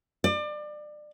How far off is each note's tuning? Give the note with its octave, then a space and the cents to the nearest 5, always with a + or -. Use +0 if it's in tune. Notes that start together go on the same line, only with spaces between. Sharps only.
D5 +30